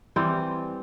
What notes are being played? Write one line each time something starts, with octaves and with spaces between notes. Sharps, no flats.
E3 G3 C4